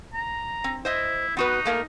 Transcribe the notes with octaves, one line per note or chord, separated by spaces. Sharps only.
A#5
C4
E4 C5 D#5 E5
B3 D#4 F#4 B4
A3 A#3 A#4